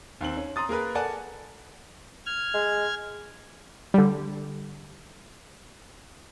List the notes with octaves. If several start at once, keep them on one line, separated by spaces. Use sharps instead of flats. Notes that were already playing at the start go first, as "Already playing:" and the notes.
D#2 C4 F#7
C#4
A#5 C6 D#6 A6
A#3 G#4 A#4 B4
A4 A#4 D5 F#5 G#5 A5
F6 G#6
G#3
D3 G3